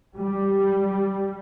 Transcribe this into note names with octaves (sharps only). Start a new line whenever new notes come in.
G3